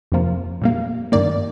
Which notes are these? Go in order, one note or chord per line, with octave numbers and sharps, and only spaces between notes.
F2 C3 F3 A#3
A#2 G3 A#3
G2 D#3 A#3 D5